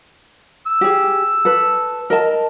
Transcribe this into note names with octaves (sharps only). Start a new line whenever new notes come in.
E6
G4 G#4
A4 B4
A#4 D#5 A5